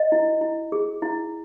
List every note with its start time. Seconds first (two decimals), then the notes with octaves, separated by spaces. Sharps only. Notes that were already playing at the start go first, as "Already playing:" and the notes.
Already playing: D#5
0.12 E4
0.41 E4
0.72 G#4
1.02 E4